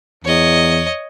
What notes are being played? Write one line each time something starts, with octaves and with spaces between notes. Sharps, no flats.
E2 C#5 D#5